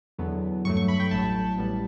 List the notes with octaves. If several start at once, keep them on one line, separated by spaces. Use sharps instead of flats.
E2 D3 F#3 B3
G2 F#3 A3 C#6
C#6
B5
G5
A1 A2 F#3 A5
A1 A2 G3 B3